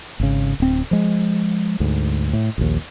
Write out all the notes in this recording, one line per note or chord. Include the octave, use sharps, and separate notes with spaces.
G#1 C#3
D1 C4
F3 G#3
D2 G#2
A2
A#1 D#2